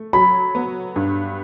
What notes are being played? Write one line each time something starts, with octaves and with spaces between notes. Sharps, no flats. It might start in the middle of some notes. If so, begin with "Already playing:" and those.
Already playing: A3
F#3 B5
B3
G2